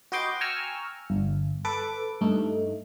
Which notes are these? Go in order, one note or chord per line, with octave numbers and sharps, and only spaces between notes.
F#4 B4 D#5 G5 C6 D6
G5 G#5 A#5 C#6 E6 F6
G1
A4 B4 D6
G2 A3 D#4